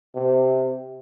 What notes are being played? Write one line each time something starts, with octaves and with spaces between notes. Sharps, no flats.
C3